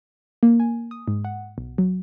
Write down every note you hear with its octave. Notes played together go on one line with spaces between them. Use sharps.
A#3
G#5
D#6
G#2
F#5
B1
F#3